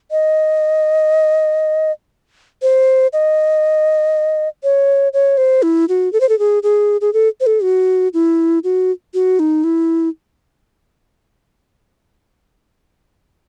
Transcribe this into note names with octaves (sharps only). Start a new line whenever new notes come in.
D#5
C5
D#5
C#5
C#5
C5
E4
F#4
A4
C5
A4
G#4
G#4
G#4
A4
C5
A4
F#4
E4
F#4
F#4
D#4
E4